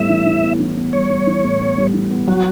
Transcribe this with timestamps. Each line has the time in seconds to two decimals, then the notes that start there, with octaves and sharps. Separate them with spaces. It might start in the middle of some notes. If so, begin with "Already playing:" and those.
Already playing: A2 G3 B3 E5
0.09 E3
0.26 E3
0.43 B3
0.60 E3
0.77 B3
0.93 G3 C#5
1.10 G3
1.27 E3
1.44 A2
1.61 B3
1.78 G3
1.94 E3
2.11 B3
2.27 F#3 F#4